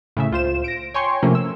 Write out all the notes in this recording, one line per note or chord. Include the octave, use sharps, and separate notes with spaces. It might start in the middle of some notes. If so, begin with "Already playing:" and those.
A2 C#3 E5
C#2 F4 C5 E7
A#6 D7
C#5 G5 G#5 C6 C#6
C3 F3 A3 A#3 C#4
E6